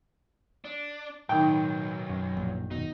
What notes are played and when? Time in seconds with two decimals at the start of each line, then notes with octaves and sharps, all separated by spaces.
0.65 D4
1.29 B1 A2 D#3 G5
2.09 F#2
2.37 A#1
2.71 D#1 B2 D#4